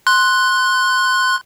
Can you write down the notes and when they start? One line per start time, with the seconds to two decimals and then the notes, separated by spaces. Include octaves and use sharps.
0.07 C6 F#6